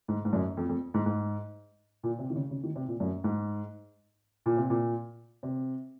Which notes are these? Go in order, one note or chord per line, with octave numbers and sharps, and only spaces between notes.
G#2
G#2
F#2
F2
F2
G#2
G#2
A#2
C3
D#3
C#3
C#3
D#3
C3
A#2
F#2
G#2
A#2
C3
A#2
C3